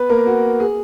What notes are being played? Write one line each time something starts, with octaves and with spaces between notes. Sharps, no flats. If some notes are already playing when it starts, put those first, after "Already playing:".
Already playing: B3 B4
A#3 A#4
F#4
G#4